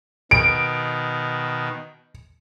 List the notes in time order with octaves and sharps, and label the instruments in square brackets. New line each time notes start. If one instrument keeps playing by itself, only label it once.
[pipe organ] B2 D#3 [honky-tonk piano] D7